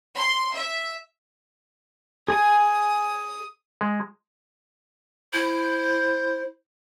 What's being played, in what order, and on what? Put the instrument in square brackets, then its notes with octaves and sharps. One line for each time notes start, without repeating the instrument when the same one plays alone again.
[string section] C6
E5
[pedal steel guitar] G#4 G#5 [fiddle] D#6
[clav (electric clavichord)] G#3
[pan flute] E4 [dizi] C5 [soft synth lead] G6